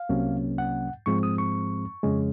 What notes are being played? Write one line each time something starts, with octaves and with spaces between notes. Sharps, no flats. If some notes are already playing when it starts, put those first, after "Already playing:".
Already playing: F5
C2 C3 F#3 A#3 C#4
F#5
G#2 F3 G#3 C4 C#6
D#6
C#6
F2 C#3 G#3 C#4